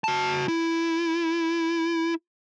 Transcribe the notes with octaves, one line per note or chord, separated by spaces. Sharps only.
F#4 A5
E4